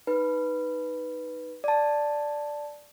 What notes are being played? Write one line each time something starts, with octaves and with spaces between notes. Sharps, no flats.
D#4 B4
D5 A5